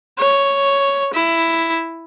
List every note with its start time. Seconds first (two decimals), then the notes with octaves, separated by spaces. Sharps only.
0.18 C#5
1.14 E4